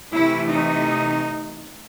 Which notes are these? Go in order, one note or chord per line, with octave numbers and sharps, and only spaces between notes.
C3 E3 A3 E4
D#4